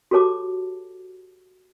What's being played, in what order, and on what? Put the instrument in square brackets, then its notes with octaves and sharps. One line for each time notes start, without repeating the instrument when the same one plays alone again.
[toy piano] F#4 G4 A4 C#5 A5 D6